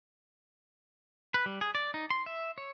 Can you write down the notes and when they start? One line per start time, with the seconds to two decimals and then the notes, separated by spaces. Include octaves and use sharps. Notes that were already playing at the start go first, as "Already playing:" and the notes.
1.34 B4
1.46 G3
1.61 G#4
1.75 D5
1.94 D#4
2.10 C6
2.26 E5
2.58 C#5